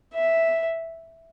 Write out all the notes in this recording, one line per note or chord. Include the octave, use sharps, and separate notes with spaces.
E5